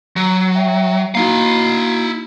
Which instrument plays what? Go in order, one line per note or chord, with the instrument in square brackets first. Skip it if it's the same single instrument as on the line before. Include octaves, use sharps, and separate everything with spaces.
[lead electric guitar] F#3
[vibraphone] E5 G5
[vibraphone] A#3 D#4 F#4 [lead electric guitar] E4 F5